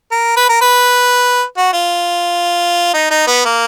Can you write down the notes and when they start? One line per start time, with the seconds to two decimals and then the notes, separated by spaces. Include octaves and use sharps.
0.11 A#4
0.37 B4
0.49 A#4
0.61 B4
1.57 F#4
1.73 F4
2.94 D#4
3.11 D#4
3.27 B3
3.45 A#3